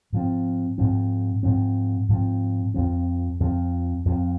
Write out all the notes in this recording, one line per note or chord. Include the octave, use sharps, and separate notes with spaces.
G#2 F3 C4
G#2 F3 C4
G#2 F3 C4
G#2 F3 C4
F2 F3 C4
F2 F3 C4
F2 F3 C4